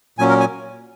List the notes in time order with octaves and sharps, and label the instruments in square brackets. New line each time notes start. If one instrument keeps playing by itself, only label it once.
[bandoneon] A#2 F#3 C#4 G#5
A#4
G#5